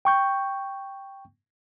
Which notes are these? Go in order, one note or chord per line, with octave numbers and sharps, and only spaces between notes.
G5 C#6 G6